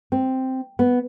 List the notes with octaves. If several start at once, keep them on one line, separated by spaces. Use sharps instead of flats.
C4
B3